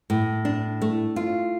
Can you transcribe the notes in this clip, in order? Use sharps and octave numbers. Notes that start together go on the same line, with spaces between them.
A2
D4
A3
F4